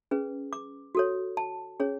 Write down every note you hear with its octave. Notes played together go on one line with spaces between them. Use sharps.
C#4 G#4 B4
D6
F#4 A4 C#5
A5
C#4 G#4 C#5